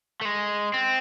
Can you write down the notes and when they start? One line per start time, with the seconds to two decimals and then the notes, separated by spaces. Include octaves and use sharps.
0.21 A3
0.25 G#3
0.74 C4